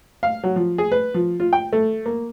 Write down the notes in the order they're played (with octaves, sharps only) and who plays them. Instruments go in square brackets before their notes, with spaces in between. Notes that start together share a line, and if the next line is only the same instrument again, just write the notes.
[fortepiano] F5
F#3
F3
G#4
B4
F3
F4
G5
A3
A#3